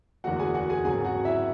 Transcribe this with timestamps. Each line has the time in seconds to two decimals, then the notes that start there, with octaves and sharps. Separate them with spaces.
0.24 F#1 E2 D3 A3 F#4 F#5
0.39 G#4 G#5
0.54 F#4 F#5
0.70 G#4 G#5
0.85 G#1 F#2 C#3 G#4 G#5
1.05 F#4 F#5
1.25 E4 E5